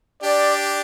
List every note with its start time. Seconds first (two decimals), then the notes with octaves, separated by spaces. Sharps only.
0.23 D4 G4 D5